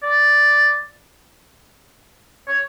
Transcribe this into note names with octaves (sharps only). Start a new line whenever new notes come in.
D5
C#5